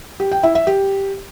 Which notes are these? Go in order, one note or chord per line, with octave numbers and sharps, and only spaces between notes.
G4
G5
E4
E5
G4